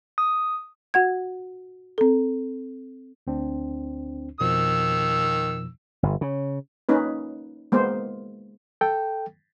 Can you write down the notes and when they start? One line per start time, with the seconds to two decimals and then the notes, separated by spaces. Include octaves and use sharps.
0.18 D#6
0.94 F#4 F#5 G#6
1.98 C4 A4
3.27 D2 C4 D4
4.40 F2 B2 D#3 F3 E6
6.03 G1
6.21 C#3
6.89 A#3 C#4 D#4 B4
7.72 G#3 A#3 B3 C5
8.81 A4 G5